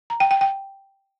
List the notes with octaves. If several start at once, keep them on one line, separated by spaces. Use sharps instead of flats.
A#5
G5
G5
G5